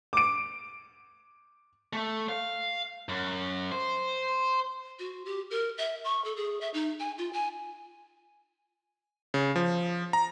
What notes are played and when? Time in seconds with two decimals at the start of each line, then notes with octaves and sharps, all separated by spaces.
0.13 D6 D7
1.93 A3
2.29 F5
3.09 F#2
3.72 C5
4.99 F#4
5.26 G4
5.51 A#4
5.78 E5
6.04 C#6
6.25 A4
6.36 G#4
6.61 E5
6.74 D#4
7.00 G#5
7.18 F4
7.33 G#5
9.34 C#3
9.56 F3
10.13 A#5